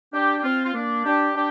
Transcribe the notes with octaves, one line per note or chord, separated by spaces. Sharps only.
D4 G4
G4
C4 F4
F4
A#3 D4
D4 G4
D4 G4